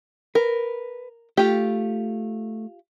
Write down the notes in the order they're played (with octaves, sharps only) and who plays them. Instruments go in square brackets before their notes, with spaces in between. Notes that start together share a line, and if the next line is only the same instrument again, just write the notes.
[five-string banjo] A#4 [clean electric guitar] B4
[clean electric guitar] A3 [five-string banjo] F4 G4